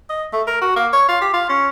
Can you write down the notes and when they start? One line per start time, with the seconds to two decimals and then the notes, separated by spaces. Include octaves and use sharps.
0.10 D#5
0.33 A3
0.47 A#4
0.61 F#4
0.76 A#3
0.93 C#5
1.09 F4
1.21 G4
1.34 F4
1.49 C#4